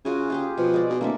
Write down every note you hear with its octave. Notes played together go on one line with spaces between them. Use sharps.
C#3 F4 F#4 G#5
F4 G4 G#4
B2 F3
G#3 D5
B2
D1 A#3 A4 E5